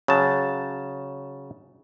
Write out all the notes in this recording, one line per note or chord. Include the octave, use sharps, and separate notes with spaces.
C#3 F#3 A5